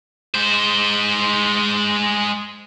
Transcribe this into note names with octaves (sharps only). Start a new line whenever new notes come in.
G#3 C5